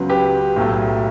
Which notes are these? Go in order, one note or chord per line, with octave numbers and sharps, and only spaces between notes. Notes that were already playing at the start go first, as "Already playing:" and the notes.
Already playing: C#2 C#3 F#3 B3
G4 B4
B1 A2 F#3 A3